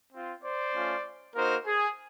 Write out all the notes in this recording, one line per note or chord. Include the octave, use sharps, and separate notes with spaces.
C4 F4
C5 D5
A3 C#4 F4
A#3 D#4 F#4 A#4 C5
G#4